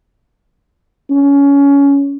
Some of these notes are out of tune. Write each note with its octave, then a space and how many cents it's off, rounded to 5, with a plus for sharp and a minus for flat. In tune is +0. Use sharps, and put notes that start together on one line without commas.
C#4 +20